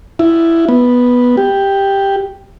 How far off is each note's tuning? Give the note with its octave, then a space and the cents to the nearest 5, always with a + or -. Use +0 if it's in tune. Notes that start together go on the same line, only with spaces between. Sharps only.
E4 +10
B3 -5
G4 +5